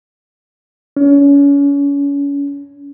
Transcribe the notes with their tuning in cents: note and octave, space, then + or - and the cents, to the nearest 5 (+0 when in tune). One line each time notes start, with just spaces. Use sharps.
C#4 +30